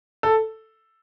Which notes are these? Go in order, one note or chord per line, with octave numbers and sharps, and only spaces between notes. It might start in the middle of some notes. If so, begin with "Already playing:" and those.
A4